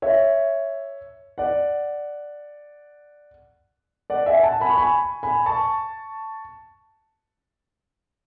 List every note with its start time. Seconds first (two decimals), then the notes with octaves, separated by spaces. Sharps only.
0.02 C#5 E5
1.38 D5 F#5
4.10 D5 F#5
4.26 E5 G#5
4.43 F#5 A5
4.60 G#5 B5
4.70 C#6
4.77 G#5 B5
5.23 G#5 B5
5.46 A5 C#6